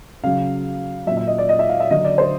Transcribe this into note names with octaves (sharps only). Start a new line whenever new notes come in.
C#3 F#3 F5
A#2 F#3 E5
E5
D#5
D5
D#5
E5
F5
E5
D3 F#3 D#5
D5
C5